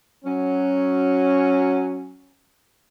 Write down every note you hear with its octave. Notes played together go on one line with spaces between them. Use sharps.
F#3 C#4